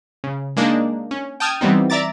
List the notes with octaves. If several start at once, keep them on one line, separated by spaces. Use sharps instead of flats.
C#3
G#3 A#3 D4 D#4
C#4
G5 A5 D#6 F6 G#6
E3 G3 B3 C4 D#4
D5 E5 A#5 D6 A6